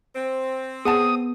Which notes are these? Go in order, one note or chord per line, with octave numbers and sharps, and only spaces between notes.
C4
B3 G#4 F#5 A5 D#6